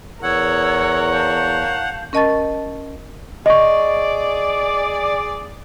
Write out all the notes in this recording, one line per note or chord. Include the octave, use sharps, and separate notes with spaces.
E2 A#4 C#5 F#5 E6 G#6
F5 A5 G6
C#4 A#4 D#5 A5 C#6 A6
G#4 D5 D#5 C#6